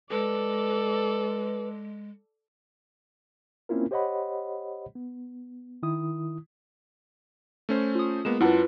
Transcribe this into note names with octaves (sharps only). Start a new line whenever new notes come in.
G#3 A4 B4 D5
A#3 C4 C#4 E4 F4 A#4
G4 C5 C#5 D#5 F#5 B5
B3
D#3 E4 D#6
A3 C#4 C5
F4 D#6
G#3 A#3 B3 E7
F#2 E4 F4 B4 F#5 A5